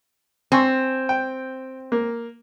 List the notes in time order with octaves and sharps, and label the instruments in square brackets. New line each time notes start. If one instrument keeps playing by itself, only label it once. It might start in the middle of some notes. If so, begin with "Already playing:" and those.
[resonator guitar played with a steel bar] C4 [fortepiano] G#5 C6 C#6
[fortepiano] G5
A#3